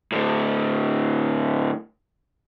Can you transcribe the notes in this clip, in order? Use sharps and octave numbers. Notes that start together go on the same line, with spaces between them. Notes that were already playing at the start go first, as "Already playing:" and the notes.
A2 D3